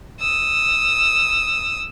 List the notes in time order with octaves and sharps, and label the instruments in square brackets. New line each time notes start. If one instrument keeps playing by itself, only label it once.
[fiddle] D#6 E6